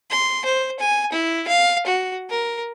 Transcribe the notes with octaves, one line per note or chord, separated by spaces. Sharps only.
C6
C5
G#5
E4
F5
F#4
A#4